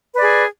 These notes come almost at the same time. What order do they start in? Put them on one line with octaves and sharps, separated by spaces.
B4 D5 G#4